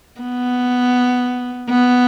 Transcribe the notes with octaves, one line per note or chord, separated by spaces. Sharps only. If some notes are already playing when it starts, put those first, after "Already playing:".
B3
B3